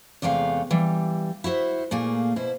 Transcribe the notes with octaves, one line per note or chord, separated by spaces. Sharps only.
E2 C3 G#3 A3 F5
E3 G3
E4 F#4 C5 E5
A#2 A3 A#3 G#4
B2 E4 C5